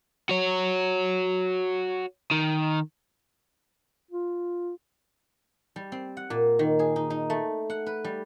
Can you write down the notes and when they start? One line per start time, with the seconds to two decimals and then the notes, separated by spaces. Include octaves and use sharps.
0.29 F#4 C#5
2.31 D#3
4.11 F4
5.76 G3
5.92 C4
6.17 F#5
6.30 A#2
6.59 D#3
6.79 G#4
6.96 D#4
7.10 D#4
7.30 A3
7.70 F#5
7.86 B4
8.04 G3